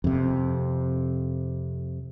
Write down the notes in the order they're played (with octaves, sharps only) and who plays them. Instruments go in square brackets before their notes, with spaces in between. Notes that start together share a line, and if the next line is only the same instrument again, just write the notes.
[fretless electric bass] F2 C3